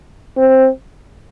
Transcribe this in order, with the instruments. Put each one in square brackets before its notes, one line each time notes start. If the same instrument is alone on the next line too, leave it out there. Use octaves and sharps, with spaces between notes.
[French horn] C4